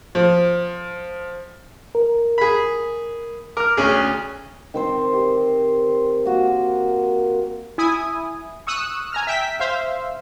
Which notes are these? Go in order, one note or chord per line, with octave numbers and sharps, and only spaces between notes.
F3
A#4
G#4 B5
A#4 D6 F6
D2 C#4 G#4
D#3 C4 C5
G4
A#3 F#4
E4 G#5 D#6
C#6 D#6 E6 F#6
G#5 A#5 F6
E5 G5 B6
C5 E5 F5